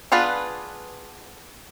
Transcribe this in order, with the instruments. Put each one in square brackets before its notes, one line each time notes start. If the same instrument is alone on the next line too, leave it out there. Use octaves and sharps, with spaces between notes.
[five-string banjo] B3 D4 F4 G#4 B4